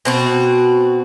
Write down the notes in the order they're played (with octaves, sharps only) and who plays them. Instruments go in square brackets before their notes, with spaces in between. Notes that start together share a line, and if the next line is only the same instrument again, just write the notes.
[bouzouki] B2 C4 F#4